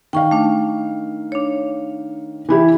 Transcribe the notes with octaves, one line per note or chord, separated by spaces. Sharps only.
D#3 F5 G5 C#6
A3 D4
D4 C#5
E3 E4 G4